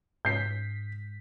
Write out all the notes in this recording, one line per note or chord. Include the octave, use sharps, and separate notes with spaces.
G#2 G6 B6 C7